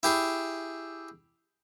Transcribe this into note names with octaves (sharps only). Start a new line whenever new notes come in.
E4 G4 G#4